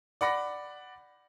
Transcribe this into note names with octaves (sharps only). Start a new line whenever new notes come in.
D5 F#5 B5 A#6